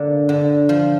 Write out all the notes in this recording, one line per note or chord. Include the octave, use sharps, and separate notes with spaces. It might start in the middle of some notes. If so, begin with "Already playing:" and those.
Already playing: D3 A#3
D3
F3